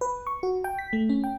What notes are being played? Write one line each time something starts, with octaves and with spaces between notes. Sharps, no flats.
B4
C#6
F#4
G5
B6
A3
C#4
G5